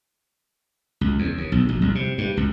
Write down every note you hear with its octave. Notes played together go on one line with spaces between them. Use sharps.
C#2
E2
D#2
B1
A#1
C2
C3
G2
C#2